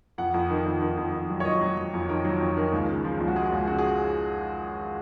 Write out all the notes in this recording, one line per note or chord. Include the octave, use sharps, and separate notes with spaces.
F2 F#5
F2
D#3
F2
D#3
F2
F2
F#3
C#5
F#3 D#5
F#3
F#3
F2
D#3 A#4
F#3
F2
D#3
C#2
C#3
F3
C#2
F#4
G#3 G#4
C#2
C#3 F#4
G#4